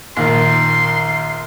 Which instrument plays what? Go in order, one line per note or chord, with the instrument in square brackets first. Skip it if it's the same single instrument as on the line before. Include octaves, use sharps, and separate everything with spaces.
[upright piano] A#1 D#3 A#4 [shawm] C6